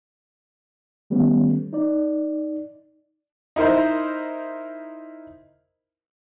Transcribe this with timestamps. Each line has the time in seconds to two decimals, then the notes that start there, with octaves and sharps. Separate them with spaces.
1.10 D#3 G3 A3 B3 C#4
1.73 D#4 D5
3.56 D#4 E4 A#4 C5